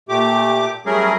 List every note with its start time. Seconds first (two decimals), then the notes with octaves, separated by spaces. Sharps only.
0.09 A#2 A3 G4 D6
0.86 F#3 G3 A3 C#4 G#4 A#4